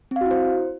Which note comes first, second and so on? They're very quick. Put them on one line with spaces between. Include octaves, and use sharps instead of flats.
C4 F5 F#4 E4 C5